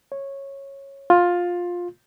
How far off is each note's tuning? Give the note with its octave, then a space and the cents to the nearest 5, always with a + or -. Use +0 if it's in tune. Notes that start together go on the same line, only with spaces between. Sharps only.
C#5 -10
F4 +15